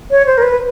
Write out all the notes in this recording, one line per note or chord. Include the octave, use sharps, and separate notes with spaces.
C#5
C5
A#4
B4